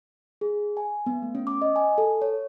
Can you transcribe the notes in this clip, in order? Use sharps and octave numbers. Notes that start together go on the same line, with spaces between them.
G#4
G#5
B3
A3
C#4
D6
D#5
G#5
A4
C#5